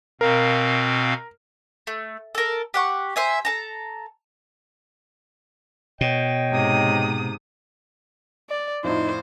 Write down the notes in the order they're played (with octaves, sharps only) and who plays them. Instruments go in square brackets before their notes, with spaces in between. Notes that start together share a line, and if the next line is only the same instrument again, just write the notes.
[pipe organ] B2 C4 F5 [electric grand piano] A#4
[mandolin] A3
A4 A#4
G4 F#5 C#6
C5 E5 G#5
A4 A5 A#5
[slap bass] B2 [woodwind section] C#5 D#5 G5
[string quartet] G#2 C3 D#6
[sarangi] D5
[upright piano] F2 A2 [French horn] D#4 [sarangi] C5